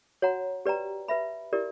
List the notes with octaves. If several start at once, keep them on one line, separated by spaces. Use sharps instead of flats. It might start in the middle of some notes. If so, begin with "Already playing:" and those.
F#4 C#5 F#5 A#5
G4 B4 D5 G5 A#5
B4 E5 B5
E4 G4 A#4 D5